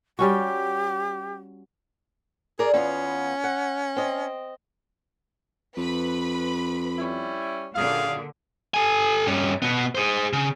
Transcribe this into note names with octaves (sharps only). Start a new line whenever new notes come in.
G3 C#4 F#4 G4
G#4 A#4 D5
E2 B3 C#4 F4
F#5
C4 D#5
F2 B4 B5
G3 C#4 E4
F#2 A#2 D3 G#4 F5
A4 G#5
G2 C#4
B2 B3
G#4 C5
C#3